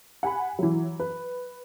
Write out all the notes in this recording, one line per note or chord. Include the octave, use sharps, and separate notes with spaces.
F#5 G#5 B5
E3 F#3
B4